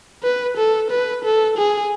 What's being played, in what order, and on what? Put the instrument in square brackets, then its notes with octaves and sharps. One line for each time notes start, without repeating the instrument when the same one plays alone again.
[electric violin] B4
A4
B4
A4
G#4